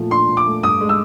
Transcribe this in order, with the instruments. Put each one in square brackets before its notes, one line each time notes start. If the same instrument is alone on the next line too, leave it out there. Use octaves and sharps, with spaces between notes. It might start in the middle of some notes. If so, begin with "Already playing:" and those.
Already playing: [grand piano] A#2 F3 A3
[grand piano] D4 [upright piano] C6
[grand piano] A#2
[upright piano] D6
[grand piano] A3
[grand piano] G2 [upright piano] D#6
[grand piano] G#3
[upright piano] E6